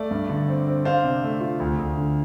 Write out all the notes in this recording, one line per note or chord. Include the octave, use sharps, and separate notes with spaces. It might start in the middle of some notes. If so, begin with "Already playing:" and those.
Already playing: A3 D5
G2
D3
C4
C4
D4 C5 F5
C3
A3
F4
D2
D2
D3